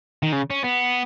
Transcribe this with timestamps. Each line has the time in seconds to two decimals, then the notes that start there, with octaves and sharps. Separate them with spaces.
0.23 D#3
0.32 C#3
0.50 C#4
0.64 B3